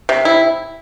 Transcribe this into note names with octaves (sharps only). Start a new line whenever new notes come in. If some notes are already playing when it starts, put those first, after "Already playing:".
C3
E4